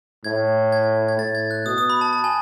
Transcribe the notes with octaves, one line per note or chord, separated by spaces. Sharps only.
A2 G#6
G#6
G#6
A2 A6
G#6
F#6
B2 D#6
D#6
B5
A5
A5
G#5